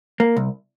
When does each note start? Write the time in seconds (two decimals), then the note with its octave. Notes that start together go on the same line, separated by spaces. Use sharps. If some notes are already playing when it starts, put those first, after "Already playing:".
0.20 A#3
0.36 C2